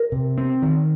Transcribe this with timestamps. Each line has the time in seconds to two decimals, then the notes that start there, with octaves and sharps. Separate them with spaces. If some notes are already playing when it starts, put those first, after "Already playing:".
Already playing: A#4
0.12 C3
0.38 C4
0.62 D#3